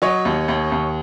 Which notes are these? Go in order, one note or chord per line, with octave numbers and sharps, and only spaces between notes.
F#3 C#5 D#5
D#2
D#2
D#2